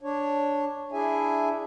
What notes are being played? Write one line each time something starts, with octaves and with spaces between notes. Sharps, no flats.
D4 C#5
D4 E4 G#4 E5 G#5